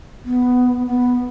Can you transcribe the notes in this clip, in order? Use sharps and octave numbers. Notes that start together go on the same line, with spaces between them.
B3
B3